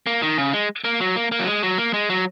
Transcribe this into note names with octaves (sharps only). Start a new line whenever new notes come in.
A#3
D#3
C#3
G#3
A#3
F#3
A#3
A#3
F#3
G#3
F#3
A#3
G#3
F#3